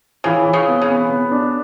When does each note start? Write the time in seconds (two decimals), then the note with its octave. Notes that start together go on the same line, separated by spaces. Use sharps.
0.24 C#3 E3
0.46 E3
0.53 C#3
0.68 B3
0.82 C#3
0.88 B3
1.09 B3
1.31 D4